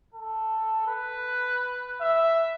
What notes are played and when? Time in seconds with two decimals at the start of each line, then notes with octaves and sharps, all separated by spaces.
0.14 A4
0.87 B4
2.01 E5